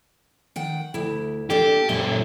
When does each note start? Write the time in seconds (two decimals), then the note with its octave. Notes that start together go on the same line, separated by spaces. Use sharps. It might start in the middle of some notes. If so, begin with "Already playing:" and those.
0.56 D#3 F#5 G5
0.94 D2 E4
1.50 A#3 D4 G4 A4
1.89 F#2 A#2 E5